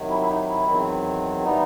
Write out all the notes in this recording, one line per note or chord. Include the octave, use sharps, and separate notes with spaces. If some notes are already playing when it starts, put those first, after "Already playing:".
Already playing: C3 D#3 F#3
E4
E4
D#4
E4
E2 D#3 F#3 C4
E3 G3 B3 D#4